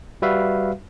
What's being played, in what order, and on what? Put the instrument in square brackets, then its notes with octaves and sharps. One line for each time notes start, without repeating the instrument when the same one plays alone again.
[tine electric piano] G3 F#4 B4 E5 F5